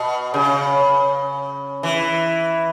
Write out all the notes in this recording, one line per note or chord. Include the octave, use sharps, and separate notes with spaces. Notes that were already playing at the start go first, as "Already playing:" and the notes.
Already playing: B2
C#3
E3